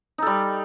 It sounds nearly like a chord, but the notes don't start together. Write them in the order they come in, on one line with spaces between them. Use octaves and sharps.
D#4 A4 G3